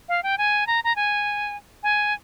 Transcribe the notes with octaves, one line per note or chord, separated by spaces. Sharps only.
F5
G5
G#5
A#5
A#5
G#5
G#5